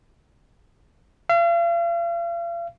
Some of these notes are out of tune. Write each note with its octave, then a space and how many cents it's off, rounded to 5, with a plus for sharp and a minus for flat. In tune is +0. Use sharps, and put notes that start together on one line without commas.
F5 -40